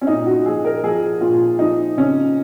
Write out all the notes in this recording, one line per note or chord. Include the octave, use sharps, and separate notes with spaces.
C#4
A#2 D#4
F#4
F3 G#4
A#4
F3 G#4
A#2 F4
F3 D#4
C#3 C#4